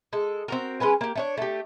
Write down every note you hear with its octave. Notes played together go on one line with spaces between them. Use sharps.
G#3 A4
C4 F#4 A#4
G#3 C#4 B4 G#5
A#3 G4
A3 D4 C#5
A3 G4